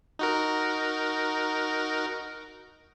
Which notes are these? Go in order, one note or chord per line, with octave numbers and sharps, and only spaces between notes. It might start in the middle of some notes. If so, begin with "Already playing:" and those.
D#4 F#4 A#4